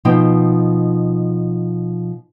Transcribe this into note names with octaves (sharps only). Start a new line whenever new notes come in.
B2 F3 D#4 G5